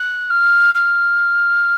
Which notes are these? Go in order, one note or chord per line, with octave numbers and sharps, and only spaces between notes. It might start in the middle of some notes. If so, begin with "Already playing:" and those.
Already playing: F#6
F6
F6